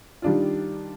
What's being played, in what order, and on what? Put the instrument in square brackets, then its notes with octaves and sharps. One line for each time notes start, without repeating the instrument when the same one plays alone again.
[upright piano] D#3 G3 D4 F4